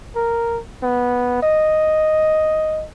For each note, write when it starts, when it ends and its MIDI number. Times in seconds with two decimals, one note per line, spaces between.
0.16 0.59 70
0.83 1.38 59
1.42 2.86 75